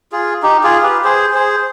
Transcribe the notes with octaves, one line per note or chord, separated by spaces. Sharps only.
F4 G#4
D#4 G4
F4 G#4
G4 B4
G#4 C5
G#4 C5